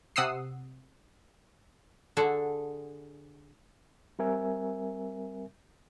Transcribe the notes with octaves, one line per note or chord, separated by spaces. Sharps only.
C3 F#5 D#6 E6 C7
D3 F#4 G#4 A4
G3 C4 A#4 E5 G#5